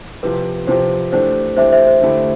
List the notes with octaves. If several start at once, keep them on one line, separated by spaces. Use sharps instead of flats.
C3 F3 C4 G4 B4
C3 F3 C4 G4 C5
E3 A3 D4 G4 C5
E3 A3 D4 G4 C5 E5
C5 E5
C5
D3 A3 E4 G4